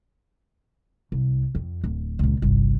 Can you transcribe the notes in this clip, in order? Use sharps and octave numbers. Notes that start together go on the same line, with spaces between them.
C2
F2
D1
C#2 A#2
G1 C2